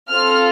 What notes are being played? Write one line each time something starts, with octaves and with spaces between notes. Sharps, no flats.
C4 F4 A4 F6